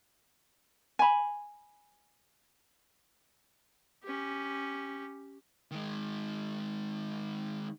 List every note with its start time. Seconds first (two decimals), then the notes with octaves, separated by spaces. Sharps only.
0.99 G#5 B5
4.04 C#4 G4
5.71 D#3 G#3